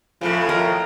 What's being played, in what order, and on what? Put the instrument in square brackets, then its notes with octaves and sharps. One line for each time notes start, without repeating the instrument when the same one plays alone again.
[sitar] F2 A2 C#3 [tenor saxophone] F3
[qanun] A#4 D#5